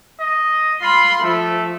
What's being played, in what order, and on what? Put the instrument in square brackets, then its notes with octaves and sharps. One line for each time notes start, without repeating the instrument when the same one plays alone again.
[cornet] D#5
[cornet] F4 [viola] B5 C6
[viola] F3 [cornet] A3